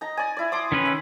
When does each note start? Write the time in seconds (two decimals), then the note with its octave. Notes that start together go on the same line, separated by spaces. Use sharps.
0.01 D#4 A#5
0.17 D5 G#5
0.37 E4 D5
0.52 C6 D6 D#6
0.72 D#3 C#4 B4
0.85 E5